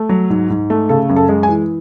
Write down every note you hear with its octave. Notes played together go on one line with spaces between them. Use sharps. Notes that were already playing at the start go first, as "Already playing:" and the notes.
Already playing: A3
F#3
G#2
G#2
A3
C#3 A4
F#2
A4
G#3
G#5
E3